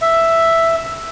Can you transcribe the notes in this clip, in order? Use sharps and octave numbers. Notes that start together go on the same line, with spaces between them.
E5